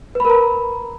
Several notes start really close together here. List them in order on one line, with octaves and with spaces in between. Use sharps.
B4 B5 A#4 A#5